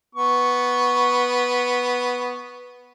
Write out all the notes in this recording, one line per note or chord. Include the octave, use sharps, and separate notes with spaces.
B3 C#6